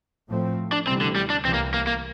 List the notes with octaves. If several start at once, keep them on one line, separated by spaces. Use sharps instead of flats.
A2 F3 A3 C4
D4
D2 C3 E3 G3 C4
D3
G3
D4
C2 C3 E3 G3 C4
A#3
A#3
A#3